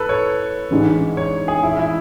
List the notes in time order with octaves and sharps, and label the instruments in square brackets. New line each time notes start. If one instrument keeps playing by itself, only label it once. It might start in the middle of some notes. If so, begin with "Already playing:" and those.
Already playing: [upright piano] A2 [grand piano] A4 B4
[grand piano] C#5
[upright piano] A1 G#2 G#3 D4
[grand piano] C#5
G#4
E4
E4